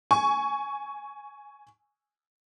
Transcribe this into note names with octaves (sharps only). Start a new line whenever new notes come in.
G#5 C#6